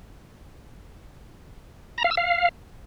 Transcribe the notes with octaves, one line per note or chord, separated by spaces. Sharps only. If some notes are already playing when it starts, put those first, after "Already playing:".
A#5
F5
E6
F5